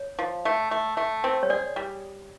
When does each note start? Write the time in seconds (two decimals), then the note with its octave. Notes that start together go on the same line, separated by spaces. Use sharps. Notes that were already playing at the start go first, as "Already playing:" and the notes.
Already playing: C#5
0.19 F3
0.45 A3
0.71 A3
0.97 A3
1.24 C4
1.43 C#5
1.50 G#4 D5
1.76 G3